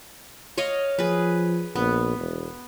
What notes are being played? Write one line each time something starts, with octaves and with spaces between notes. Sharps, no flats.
C#5 D#5 F5
F3 G#4 B4
A#1 B3
E1